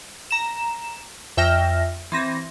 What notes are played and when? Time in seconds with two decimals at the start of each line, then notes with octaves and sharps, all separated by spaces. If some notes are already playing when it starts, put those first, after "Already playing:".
0.31 A#5 E7
1.37 F2 E5 G5 F6 A#6
2.12 E3 C4 A#6